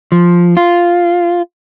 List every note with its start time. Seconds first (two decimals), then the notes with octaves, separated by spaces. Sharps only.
0.12 F3
0.57 F4